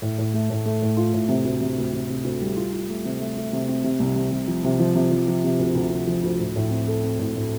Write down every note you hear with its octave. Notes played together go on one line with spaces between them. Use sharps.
A2
A2
A3
A2
A3
A2
F4
A2
C3
D2
C3
D2
C3
C3
D2
G3
F4
F4
A3
C3
A3
A3
C3
C4
C3
C2
C3
C3
F3
C3
F3
C3
F3
F3
C3
D2
D2
C3
F3
D2
A2
A2
C4
A4
C4
A2
A2